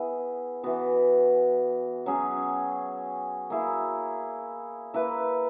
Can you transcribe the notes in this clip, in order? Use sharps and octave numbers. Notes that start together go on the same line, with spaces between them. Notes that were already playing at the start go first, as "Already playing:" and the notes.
Already playing: B3 E4 G#4 B4
E3 B3 F#4
F#3 C#4 G#4
A#3 E4 G#4
A#3 E4 B4